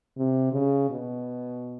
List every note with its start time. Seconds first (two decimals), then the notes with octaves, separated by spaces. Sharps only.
0.17 C3
0.53 C#3
0.90 B2